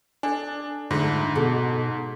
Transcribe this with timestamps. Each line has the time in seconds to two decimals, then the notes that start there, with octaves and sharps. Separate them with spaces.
0.23 D4 A4 D5 G#5
0.91 G#2 D3 A3 F4
1.35 B2 G#4 A4